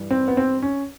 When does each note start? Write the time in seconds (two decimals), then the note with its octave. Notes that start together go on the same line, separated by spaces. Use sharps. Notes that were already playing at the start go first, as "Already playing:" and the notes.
Already playing: G2 E3 G3
0.11 C4
0.28 B3
0.37 C4
0.62 C#4